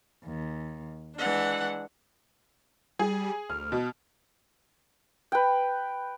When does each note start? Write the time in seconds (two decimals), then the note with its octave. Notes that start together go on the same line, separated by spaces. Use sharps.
0.24 D#2
1.18 E3 G#3 D4 F#5
2.99 G3 G#4
3.50 D2 F6
3.72 B2
5.32 B4 G5